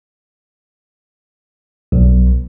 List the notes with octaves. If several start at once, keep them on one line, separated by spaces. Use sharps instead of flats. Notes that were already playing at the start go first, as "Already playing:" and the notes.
B1